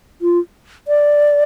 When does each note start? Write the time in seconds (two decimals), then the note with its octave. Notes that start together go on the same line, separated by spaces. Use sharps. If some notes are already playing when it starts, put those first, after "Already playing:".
0.22 F4
0.88 D5